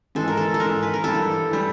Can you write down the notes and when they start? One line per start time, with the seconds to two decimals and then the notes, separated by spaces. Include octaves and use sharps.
0.15 G#2 E3 G#3 A4
0.28 A#4
0.37 A4
0.54 A4
0.60 G#2 E3 G#3 A#4
0.83 B4
0.94 A#4
1.04 G2 E3 G3 A4
1.50 E3 G3